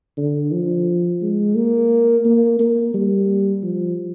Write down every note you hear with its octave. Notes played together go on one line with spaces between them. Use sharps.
D3
F3
G#3
A#3
A#3
A#3
G3
F3